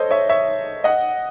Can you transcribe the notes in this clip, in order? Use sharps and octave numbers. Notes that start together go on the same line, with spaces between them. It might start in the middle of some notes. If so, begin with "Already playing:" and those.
Already playing: A4 C5 C#5 D#5
C#5 E5
C#5 E5
D#5 F#5